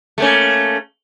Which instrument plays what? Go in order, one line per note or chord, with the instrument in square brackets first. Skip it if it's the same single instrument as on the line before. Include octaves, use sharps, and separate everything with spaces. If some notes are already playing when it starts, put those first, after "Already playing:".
[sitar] A3 A#3 C#4